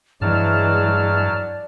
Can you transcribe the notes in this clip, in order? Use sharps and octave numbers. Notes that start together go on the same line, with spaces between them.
G2 E3 F#3 G#3 D5 A5 F6